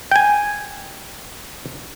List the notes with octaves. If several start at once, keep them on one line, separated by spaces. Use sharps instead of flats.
G5 G#5